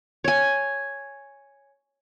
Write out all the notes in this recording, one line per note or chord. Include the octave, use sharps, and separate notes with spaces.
C#5 G#5